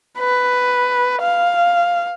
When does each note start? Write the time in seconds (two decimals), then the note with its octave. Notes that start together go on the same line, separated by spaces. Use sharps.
0.19 B4
1.22 F5